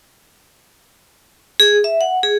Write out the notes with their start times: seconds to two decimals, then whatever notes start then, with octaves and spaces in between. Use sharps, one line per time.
1.60 G#4
1.84 E5
2.01 F#5
2.23 G#4